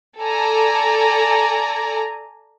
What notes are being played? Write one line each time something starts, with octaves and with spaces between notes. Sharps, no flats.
A4 D5 G#5 A#5